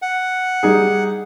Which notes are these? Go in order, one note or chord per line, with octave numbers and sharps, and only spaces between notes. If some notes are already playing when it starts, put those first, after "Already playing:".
F#5
G3 D#4 G#4